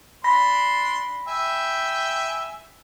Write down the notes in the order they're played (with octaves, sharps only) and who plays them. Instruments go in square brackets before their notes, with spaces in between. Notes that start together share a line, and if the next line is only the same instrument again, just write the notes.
[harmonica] D4 C6 [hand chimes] B5 A#6 B6
[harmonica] E5 G5 G#5